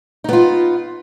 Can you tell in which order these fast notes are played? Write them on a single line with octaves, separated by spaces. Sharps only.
D#4 B3 F4